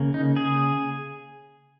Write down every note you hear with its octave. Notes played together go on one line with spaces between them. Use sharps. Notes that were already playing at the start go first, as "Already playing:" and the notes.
Already playing: C#3 A#3
D#4
G#4